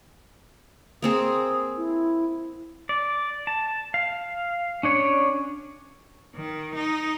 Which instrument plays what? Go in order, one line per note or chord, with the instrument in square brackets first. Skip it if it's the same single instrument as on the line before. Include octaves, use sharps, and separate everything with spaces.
[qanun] A#3 C4 G#4 [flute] D#6
[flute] E4
[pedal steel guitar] D5
A5
F5
C#4 D4 C#5
[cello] D#3
D#4